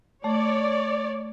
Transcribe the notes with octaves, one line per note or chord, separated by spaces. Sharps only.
A3 C#5 D5